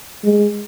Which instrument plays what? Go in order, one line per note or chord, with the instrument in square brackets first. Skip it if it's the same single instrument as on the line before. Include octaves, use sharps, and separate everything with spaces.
[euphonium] G#3